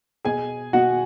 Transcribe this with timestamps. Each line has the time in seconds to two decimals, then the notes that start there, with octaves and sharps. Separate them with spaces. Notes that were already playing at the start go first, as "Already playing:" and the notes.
0.25 B2 G#4 G#5
0.73 B2 F#4 F#5